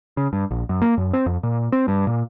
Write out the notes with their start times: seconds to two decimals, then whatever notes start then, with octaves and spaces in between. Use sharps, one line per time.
0.17 C#3
0.33 G2
0.51 A#1
0.69 F#2
0.82 A#3
0.98 F#2
1.13 C4
1.26 F2
1.43 A#2
1.72 C4
1.88 G2
2.07 A#2